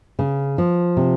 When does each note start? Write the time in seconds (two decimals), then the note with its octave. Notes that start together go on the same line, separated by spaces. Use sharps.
0.19 C#3
0.58 F3
0.97 C3